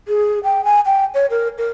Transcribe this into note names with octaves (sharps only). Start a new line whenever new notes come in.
G#4
G5
G#5
G5
C#5
A#4
A#4